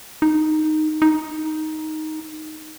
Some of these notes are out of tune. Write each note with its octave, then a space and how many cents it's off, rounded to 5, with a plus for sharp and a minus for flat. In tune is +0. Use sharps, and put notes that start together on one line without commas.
D#4 -5
D#4 +5